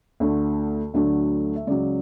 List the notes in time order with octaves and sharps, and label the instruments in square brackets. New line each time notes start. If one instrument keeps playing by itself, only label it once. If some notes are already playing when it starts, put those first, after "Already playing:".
[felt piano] D2 D3 A3
D2 D3 F#3 A3 D4
E5
C#2 C#3 F#3 D5